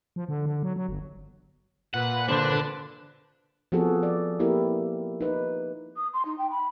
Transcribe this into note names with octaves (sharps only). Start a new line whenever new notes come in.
F3
D3
D3
F#3
F#3
G1
A#2 B4 F#5 F#6
D3 D4 C5
F3 B3 C4 F#4 G#4 A4
D5
A#3 B3 E4 G4 A#4
D#4 B4
D#6
C6
D#4
G5
B5